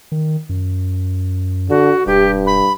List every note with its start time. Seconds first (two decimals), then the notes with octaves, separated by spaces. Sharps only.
0.12 D#3
0.49 F#2
1.70 D3 F#4
2.07 E1 G2 G4
2.47 B5